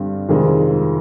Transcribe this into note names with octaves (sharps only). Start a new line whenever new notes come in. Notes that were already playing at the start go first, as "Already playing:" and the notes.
Already playing: G2 D3 G3 C4
F2 C3 D#3 G#3